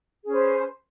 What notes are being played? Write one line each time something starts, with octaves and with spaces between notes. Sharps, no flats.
C#4 G#4 B4 C5